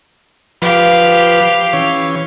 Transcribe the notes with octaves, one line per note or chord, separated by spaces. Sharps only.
F3 G4 B4 F5
E3 C#4 C#5